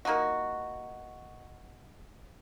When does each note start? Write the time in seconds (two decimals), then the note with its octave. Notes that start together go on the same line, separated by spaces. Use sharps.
0.05 A#3 D#4 F4 F#4